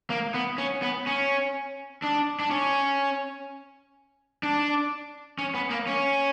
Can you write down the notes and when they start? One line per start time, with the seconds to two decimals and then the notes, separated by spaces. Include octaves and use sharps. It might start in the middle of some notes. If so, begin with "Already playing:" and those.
0.10 A#3
0.34 B3
0.58 C#4
0.82 B3
1.06 C#4
2.02 D4
2.39 D4
2.51 C#4
4.43 D4
5.39 C#4
5.55 B3
5.71 A#3
5.87 C#4